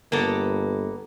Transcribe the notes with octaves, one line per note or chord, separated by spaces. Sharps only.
G1 A#3 B3 A4